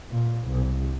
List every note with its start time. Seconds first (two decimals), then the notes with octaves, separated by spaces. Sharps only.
0.11 A#2
0.48 C2